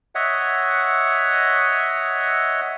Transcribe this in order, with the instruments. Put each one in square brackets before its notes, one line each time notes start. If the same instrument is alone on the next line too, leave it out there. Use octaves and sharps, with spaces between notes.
[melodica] C#5 D#5 E5 F#5